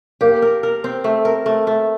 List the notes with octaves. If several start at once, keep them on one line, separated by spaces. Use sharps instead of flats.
A#3 G4
A#4
A#4
C4
A3
A#4
A3
A3